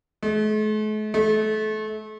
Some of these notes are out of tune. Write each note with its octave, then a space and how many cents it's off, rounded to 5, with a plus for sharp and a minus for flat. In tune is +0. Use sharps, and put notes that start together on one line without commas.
A3 -45
A3 -30